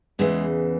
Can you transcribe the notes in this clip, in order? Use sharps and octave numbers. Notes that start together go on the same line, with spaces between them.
E2 C#3 E3 G#3